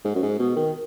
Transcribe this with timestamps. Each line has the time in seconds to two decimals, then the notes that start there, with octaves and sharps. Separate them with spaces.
0.05 G#2
0.15 F#2
0.22 G#2
0.39 B2
0.56 D#3